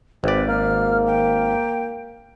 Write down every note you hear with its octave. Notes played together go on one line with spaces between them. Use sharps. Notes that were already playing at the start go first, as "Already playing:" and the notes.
G#1 C4 B4 D5
A#3 F6
G5